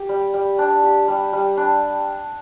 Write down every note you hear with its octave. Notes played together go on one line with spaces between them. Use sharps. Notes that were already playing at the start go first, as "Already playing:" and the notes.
Already playing: G4
G3
G3
D4
G4
G3
G3
D4